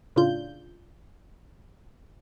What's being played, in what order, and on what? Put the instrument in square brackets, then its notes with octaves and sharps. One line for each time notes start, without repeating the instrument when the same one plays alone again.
[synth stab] A2 C#3 D4 F4 G6